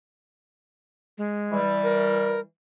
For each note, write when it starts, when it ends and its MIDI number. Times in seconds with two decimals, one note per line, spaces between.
1.18 1.60 56
1.51 2.41 52
1.51 2.41 55
1.84 2.40 70